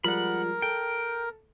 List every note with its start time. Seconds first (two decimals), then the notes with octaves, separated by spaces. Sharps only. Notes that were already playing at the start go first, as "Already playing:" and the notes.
0.04 F3 G3 G#3 A#4 F#5 B5
0.62 A4 G5